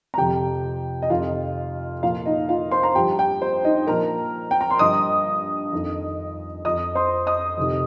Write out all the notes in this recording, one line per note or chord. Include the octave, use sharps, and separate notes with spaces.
A#5
F2 C3 F3 G4 G5
D#5
F2 C3 D#3 F4 F5
A#2 F3 F4 F5
D#4 D#5
F4 F5
C5 C6
A#5
G2 F3 G4 G5
G4 G5
C5
D#4 D#5
A#2 F3 A#4 A#5
G5
A#5
C6
G2 F3 D#5 D#6
F2 D#3
F2 F3 D#5 D#6
C5 C6
D#5 D#6
F2 C3 D#3